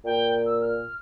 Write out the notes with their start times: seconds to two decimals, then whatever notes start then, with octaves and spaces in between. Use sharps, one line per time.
0.05 A#2 G5
0.46 E6
0.61 F6